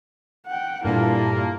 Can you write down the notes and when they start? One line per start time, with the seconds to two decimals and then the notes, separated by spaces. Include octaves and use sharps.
0.47 F#5 G5
0.84 G2 A#2 A#3 E4 A4